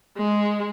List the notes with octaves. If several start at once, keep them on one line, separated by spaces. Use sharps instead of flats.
G#3